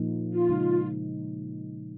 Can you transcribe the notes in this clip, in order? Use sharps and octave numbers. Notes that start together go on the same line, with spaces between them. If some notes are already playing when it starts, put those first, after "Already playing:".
Already playing: A#2 F3 A#3 D#4
F4
C#3 G#3 D#4